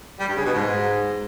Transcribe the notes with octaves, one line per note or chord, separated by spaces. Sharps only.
G3
G2
C#3
B2
G#2